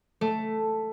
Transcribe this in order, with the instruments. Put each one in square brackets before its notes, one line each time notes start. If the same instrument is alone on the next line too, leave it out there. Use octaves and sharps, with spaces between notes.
[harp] A3